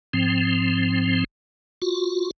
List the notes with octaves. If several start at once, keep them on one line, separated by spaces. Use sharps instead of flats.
G#2 F3 C4
F4 F#4